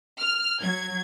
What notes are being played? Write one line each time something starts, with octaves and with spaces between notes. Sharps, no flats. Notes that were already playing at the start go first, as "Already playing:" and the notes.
F6
F#3 G#6